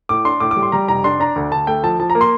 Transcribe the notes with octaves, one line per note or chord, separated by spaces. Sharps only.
A2 D6
D4 C6
A2 D6
D6
G3
C6
G3 A#5
F1 A#5
D4 C6
D4 A#5
D2
D2 A5
A3 G5
F3 A5
F3 A5
A#5
A#3
C6